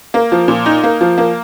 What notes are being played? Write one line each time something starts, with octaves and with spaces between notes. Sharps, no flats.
A#3
F3
A#2
D#4
A#3
F3
A#3